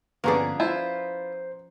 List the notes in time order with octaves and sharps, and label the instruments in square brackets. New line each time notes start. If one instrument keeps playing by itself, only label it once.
[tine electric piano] G1 [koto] F3 C#4 D4 [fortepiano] A#3 B3 G#4
[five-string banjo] E4 F4 [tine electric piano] C5